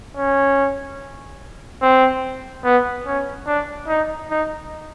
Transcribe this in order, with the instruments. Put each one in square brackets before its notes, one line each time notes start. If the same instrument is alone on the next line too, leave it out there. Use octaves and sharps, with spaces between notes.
[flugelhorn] C#4
C4
B3
C#4
D4
D#4
D#4